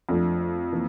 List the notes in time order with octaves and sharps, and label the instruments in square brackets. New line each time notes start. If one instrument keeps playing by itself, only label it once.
[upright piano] F2 [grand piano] F3 A3 D4 F4
[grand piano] E3 A#3